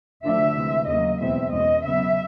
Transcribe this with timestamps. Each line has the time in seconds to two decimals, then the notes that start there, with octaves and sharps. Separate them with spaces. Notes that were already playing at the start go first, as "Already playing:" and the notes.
0.24 D2 D3 F3 A3 D4 E5
0.56 D2 C3 E3 G#3
0.87 D#2 C#3 F#3 A#3 D#5
1.20 E2 B2 G#3 C4 E5
1.51 E2 B2 G#3 C#4 D#5
1.84 C#3 F#3 B3 E5